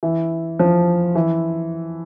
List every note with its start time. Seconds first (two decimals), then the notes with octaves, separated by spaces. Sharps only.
0.03 E3
0.59 F3
1.15 E3